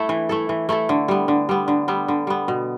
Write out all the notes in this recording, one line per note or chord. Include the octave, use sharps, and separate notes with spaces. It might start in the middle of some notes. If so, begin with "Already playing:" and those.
Already playing: A3 E4 A4
E3
A3 E4 A4
E3
A3 E4 A4
D3
G3 B3
D3
G3 B3
D3
G3 B3
D3
G3 B3
B2